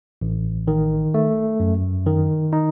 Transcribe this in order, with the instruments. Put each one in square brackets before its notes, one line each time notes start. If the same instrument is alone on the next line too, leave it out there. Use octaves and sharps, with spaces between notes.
[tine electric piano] A1
D#3
A3
F#2
D#3
D#4